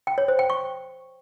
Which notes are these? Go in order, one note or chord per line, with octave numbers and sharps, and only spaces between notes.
G5
C#5
C5
G5
C#6